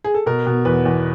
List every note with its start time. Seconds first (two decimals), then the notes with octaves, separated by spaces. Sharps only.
0.04 G#4
0.14 A4
0.26 B2 A#4
0.46 B2
0.65 E2 B4
0.85 E2